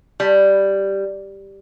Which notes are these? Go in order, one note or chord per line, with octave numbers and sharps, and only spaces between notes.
G3